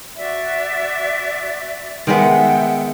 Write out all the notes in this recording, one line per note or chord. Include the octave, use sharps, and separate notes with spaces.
F#4 D5 E5
D#3 G#3 B3 E5 F#5 G5